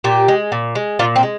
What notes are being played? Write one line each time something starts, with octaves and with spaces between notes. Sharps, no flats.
A#2 G4
G#3
A#2
G#3
A#2 F4
C4
G#3